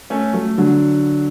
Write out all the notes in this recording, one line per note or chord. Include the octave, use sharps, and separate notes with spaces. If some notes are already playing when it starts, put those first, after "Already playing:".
A3 C#4
F#3 A3
D3 F#3